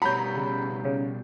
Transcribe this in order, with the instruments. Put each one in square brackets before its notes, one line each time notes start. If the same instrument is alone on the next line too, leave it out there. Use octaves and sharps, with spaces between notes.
[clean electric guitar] B2 G3 F#4 [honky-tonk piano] C#5 A#5 [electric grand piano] B5 G6
[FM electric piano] C#3
C#3